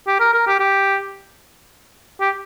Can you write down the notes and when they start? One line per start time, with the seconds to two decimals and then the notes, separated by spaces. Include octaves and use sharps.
0.07 G4
0.20 A#4
0.34 A#4
0.47 G4
0.60 G4
2.21 G4